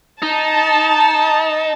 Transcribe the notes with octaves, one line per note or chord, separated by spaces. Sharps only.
D#4 A5